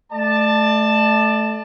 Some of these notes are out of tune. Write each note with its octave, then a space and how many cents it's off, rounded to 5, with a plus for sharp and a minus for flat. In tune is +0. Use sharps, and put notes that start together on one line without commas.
A3 -20 D5 +30 A5 +0